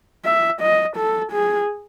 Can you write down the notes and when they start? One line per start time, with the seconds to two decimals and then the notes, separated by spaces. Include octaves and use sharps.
0.25 E5
0.61 D#5
0.97 A4
1.32 G#4